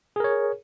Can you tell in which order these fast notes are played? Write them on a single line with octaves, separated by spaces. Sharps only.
G#4 A#4 C#5